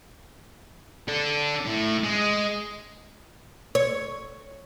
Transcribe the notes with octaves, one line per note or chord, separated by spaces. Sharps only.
D4 A4
A2
G#3
C#5